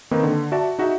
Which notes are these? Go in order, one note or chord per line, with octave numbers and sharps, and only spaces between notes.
D#3 A#3 C4 D#4 B4
D3
F#4 D5 E5 A5
D#4 F#4 G#4 E5